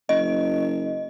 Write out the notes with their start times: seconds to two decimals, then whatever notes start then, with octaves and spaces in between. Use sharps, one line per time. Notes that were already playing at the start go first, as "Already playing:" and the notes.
0.09 F#1 D#5